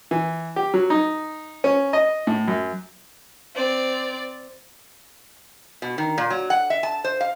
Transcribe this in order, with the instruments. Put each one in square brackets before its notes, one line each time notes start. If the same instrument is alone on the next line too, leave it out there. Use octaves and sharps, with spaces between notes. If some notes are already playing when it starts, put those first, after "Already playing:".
[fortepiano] E3
G4
F#3
D#4
C#4
D#5
A2
F#2
[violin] C4 D5
[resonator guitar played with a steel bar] B2
D#3
A#2
F#3
F#5
E5
A5
C5
F5